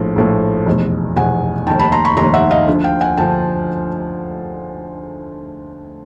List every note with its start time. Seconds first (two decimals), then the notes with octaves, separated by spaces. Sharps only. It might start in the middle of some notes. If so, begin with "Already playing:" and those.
Already playing: A#1 A2 F3
0.16 A#1 A2 F3
0.66 F1 E2 B2
1.16 F1 E2 B2 F#5 G#5
1.67 F1 D#2 D#3 G5 A5
1.79 A5 B5
1.92 A#5 C6
2.05 B5 C#6
2.17 F1 D#2 D#3 A#5 C6
2.34 E5 F#5
2.51 D#5 F5
2.67 D2 D3 F3
2.84 F5 G5
3.01 F#5 G#5
3.17 D2 D3 F3 G5 A5